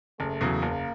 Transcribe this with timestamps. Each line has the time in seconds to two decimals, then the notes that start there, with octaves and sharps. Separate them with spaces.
0.19 F#1 A3
0.41 E2 C#3 F#3
0.62 F#1 A#3